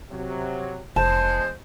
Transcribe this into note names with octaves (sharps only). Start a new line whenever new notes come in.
C3 F#3
F1 E2 G#3 C5 A5